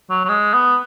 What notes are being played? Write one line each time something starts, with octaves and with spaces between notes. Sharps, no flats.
F#3
F#3
G#3
B3